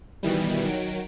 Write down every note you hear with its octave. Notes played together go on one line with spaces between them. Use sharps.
B2 D#3 E3 G3
D#3 F#3 D7